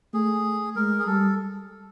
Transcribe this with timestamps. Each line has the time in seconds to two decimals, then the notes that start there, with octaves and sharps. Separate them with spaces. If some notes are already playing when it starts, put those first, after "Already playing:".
0.14 A3 G#4
0.76 G#3 A#4
0.99 G#4
1.07 G3 A4